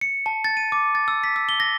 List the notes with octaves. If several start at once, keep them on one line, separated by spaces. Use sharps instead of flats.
C#7
A5
A6
D#7
D6
A6
E6
B6
E6
G7
A#6